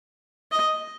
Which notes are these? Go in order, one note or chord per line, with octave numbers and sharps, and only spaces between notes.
D#5